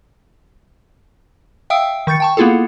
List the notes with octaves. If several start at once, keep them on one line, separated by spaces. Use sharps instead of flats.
E5 F5 G5 D#6 E6 D7
D#3 C#6 G6 A6 C#7
G5 A5 C#6
A#3 B3 E4 F4 G#4 A4